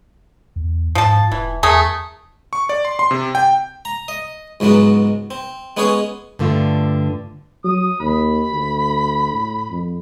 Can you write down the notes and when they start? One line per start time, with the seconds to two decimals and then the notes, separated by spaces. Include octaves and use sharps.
0.56 E2
0.95 G#2 F3 A5
1.32 E1 E3
1.63 E2 A3 G#4 A#4
2.53 C#6
2.69 D5
2.85 C6
2.99 C6
3.11 C3
3.35 G5
3.85 A#5
4.08 D#5
4.60 C#2 G#2 F#3 G#3 B3
5.31 C4
5.77 G#3 B3 C#4 G#4 C#5
6.39 G2 D3 A3 F4
7.64 F#3 D#6
8.00 D#2 B5
8.51 D2
9.33 A2
9.70 F2